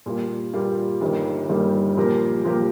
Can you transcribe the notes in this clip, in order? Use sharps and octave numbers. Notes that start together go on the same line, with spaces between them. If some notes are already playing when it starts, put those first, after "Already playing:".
A#2 G3 A#3 F4
A#2 G3 A#3 F4
G1 G2 D#3 G3 A#3
G1 G2 D#3 G3 A#3
A#2 F3 A#3 G4 A#4
A#2 F3 A#3 G4 A#4